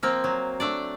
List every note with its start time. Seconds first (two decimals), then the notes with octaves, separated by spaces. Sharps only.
0.03 F3 A#3 C4
0.24 F#3
0.60 A3 D4 D5